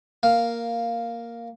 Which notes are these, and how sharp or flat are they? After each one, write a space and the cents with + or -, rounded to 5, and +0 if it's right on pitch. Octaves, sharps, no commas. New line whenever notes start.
A#3 +0 F5 +0